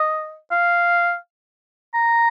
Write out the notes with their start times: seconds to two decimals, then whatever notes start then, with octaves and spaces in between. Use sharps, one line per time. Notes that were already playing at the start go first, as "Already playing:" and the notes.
Already playing: D#5
0.51 F5
1.94 A#5